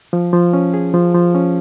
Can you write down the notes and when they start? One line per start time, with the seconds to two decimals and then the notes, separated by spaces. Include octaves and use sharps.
0.13 F3
0.33 F3
0.53 C#4
0.74 G#4
0.94 F3
1.15 F3
1.35 C#4